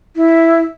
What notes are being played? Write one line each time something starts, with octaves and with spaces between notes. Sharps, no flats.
E4